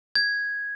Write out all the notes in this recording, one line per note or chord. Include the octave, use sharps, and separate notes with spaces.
G#6